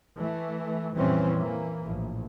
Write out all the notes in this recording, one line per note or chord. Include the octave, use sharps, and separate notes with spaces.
E3 A3
F2 A#2 E3 G3 C4 C#4
E3 A#3
A#1 A2